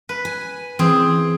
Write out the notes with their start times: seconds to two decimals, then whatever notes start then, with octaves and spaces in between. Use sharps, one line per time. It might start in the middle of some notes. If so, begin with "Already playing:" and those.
0.09 B4
0.25 G#5
0.79 E3 C4 G#4